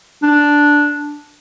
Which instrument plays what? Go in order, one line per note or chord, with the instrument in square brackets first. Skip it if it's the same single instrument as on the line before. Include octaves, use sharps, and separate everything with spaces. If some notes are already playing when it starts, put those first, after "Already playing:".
[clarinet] D4